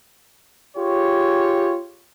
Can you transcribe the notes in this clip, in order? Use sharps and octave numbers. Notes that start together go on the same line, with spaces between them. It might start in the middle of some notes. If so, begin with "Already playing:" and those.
F4 G4 G#4 C#5